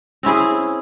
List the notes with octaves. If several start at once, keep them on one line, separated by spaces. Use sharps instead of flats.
C4 C#4 E4 G#4